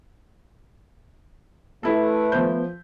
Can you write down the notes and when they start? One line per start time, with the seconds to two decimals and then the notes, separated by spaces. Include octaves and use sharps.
1.83 A3 E4 A4 B4
2.32 F3 B3 C5 G6